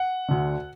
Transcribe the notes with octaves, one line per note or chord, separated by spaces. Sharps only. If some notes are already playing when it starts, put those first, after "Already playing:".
Already playing: F#5
D2 D3